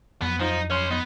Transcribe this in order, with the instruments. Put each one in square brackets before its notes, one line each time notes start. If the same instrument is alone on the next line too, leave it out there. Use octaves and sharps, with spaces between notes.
[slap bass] F2 F#3 [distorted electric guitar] B3
[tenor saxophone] F3 [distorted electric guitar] D#4
[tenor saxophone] C#4 [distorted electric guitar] C#5 C6
[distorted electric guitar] B3 [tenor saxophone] D#4